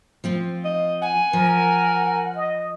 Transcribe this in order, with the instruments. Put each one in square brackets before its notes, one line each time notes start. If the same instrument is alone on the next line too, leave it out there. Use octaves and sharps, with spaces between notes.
[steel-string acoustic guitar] F3 C4 F4
[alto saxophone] D#5
[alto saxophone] F#5 [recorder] G#5
[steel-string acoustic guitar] F3 [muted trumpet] A#4
[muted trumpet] D#5